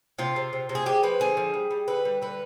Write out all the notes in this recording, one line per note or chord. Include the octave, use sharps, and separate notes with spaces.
C3 F4
C3
C3
C3
G#4
G#3 G4
F3 B4
D3 G#4
F3
G3
G3
D3 B4
G3
D3 B4